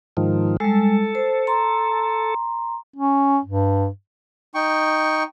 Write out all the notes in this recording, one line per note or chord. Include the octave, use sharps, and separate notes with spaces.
G#2 D#3 F3
G3 G#3 A4
C5
A#5 C6
C#4
G2
D#4 G5 C#6